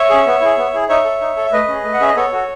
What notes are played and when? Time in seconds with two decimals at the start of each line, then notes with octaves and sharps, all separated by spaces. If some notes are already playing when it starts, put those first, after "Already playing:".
Already playing: C#5 E5
0.09 C#4 G#4
0.26 B3
0.41 E4 G#4
0.57 B3
0.74 E4 G#4
0.89 D#4 C#5 E5
1.05 A4
1.21 D#4
1.37 A4
1.46 E5
1.52 A3 B4 D#5
1.68 C#4 G#4
1.84 A3
1.94 F#5
2.00 C#4 G#4 E5
2.08 D#5
2.16 B3 A4 C#5
2.32 F#4 A4